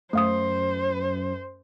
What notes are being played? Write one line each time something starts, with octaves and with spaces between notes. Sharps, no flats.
F#2 A3 C5 F5 D#6